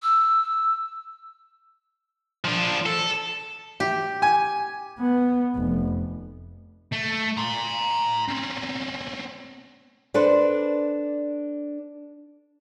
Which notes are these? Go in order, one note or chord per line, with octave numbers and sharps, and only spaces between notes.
E6
F3 D4
A4
G4
G#5
B3
F1
A3
A#5 C6
C4 C#4
D4 A4 B4 C5 D5